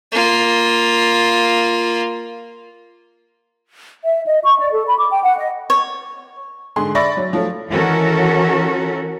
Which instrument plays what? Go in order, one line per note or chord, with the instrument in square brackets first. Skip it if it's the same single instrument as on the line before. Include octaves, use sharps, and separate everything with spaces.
[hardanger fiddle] A#3 F4
[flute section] E5
D#5
C#6
D5
A4
B5
D6
G5
F#5
D#5
[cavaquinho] C#5
[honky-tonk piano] G#2 D3 G#4 C6
D5 E5 B5 C#6 A6 A#6
F#3
F3 F#3 A3
[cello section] D#3 E3 C#4 F#4 A4 A#4